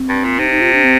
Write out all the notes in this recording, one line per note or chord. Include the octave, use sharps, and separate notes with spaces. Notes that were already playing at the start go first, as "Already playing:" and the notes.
Already playing: C4
G2
A#2
C3 D#4
D#4
F4
D4
C4